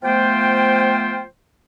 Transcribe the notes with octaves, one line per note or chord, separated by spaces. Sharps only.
F3 A3 B3 F4 C5 G5